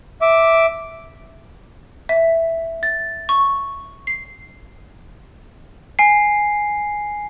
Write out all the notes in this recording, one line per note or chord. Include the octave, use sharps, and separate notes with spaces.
E5 D6
E5
A6
C#6
C7
G#5 C7